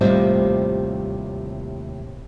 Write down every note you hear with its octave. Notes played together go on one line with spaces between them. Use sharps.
D#2 A2 C3 G3 F4 C5